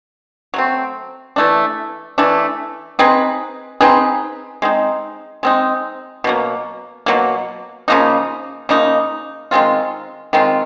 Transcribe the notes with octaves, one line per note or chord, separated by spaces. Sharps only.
F#3 A3 C4
E3 A3 D4
E3 A3 D4
C4 D#4 G#4 B4
C4 D#4 G#4 B4
G#3 C4 D#4
G#3 C4 D#4
B2 F#3 A#3
B2 F#3 A#3
C#3 F3 A#3 D#4
C#3 F3 A#3 D#4
D#3 G#3 C4 F4
D#3 G#3 C4 F4